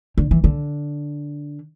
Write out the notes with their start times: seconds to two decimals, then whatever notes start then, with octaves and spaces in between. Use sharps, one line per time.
0.18 D3
0.31 E3
0.44 D3